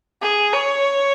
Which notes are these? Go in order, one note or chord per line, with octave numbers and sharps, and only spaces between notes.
G#4
C#5